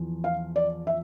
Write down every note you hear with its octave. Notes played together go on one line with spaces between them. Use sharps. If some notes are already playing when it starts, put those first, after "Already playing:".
Already playing: E2 F3
F5
D5
E5